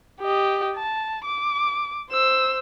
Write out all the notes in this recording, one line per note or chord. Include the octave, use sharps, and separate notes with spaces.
G4 D#5
A5
D6
C5 E6